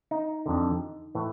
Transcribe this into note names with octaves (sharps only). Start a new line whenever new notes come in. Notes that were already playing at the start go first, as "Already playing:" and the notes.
D#4
F2 D3
A2 E3